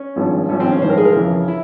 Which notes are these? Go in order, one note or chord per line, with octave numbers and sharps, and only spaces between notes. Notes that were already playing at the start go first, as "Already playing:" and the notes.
Already playing: C#4
G#1 G2 F3
G#1 G2 F3 C#4
C4
C#4
A#1 G#2 E3 G3 C5
A#4
G#4
A#4
F2 C#3 E3
E4